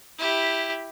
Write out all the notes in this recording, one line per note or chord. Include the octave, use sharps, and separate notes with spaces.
E4 G4